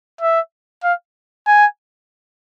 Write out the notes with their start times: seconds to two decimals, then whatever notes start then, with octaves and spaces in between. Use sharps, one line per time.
0.21 E5
0.84 F5
1.47 G#5